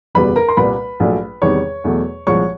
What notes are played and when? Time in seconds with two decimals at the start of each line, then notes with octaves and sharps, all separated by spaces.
0.15 F#1 E2 B2 G3 B4 B5
0.36 A#4 A#5
0.48 C6
0.57 C2 A#2 G3 B4 B5
1.00 A#1 A#2 F#3 A3
1.42 E2 C3 D#3 G3 C#5 C#6
1.84 E2 B2 F#3 A3
2.27 C2 A#2 F3 G#3 C#5 C#6